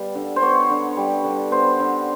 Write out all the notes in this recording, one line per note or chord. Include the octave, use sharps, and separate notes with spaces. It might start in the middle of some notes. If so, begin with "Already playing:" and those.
Already playing: G3 B3 F5
D3
C5
B3 C#5
D3
G3
D3
B3 C5
D3